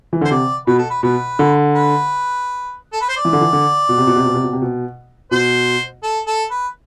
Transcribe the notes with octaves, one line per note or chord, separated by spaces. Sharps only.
E3
D3 C5
C3 D5
B2 B4
A4
B4
B2 B4
D3
B4
A4
B4
C5
D5
E3
D3
E3
D3
B2
C3
B2
C3
B2
C3
B2
C3
B2
B2 C5
A4
A4
B4